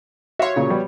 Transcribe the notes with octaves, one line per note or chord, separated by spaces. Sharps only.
F#4 C#5 E5 F5 C6
A#2 C#3
G3 B3